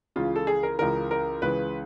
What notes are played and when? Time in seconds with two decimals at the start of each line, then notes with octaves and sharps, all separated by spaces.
0.16 C#2 C#3 E3 F4
0.36 A4
0.47 G#4
0.63 A#4
0.78 C#2 C#3 E3 A#4
1.11 A#4
1.42 C#2 C#3 E3 B4